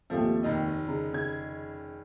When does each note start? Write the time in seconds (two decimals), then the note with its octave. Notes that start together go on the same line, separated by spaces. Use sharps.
0.10 G#1 D#2 F3 A3
0.43 F1 D#3 D#5
0.88 C#3 A#5
1.13 C#3 G#6